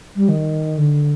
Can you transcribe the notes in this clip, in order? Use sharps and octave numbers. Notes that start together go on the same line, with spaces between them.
G3
D#3
D3